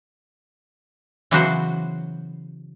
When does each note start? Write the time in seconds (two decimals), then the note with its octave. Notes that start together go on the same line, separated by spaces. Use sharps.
1.31 C#3 E3 F#3 B3 F#4 C5